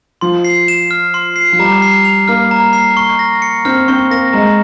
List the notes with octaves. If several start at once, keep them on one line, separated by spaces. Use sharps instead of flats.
F3 C6
C7
E7
F6
C6
C7
F3
G3 A#5
C7
F7
A#3 F6
A#5
C7
C#6
A#6
C#7
C4 F6
C4 C#6
A#3 A#6
G#3 A#5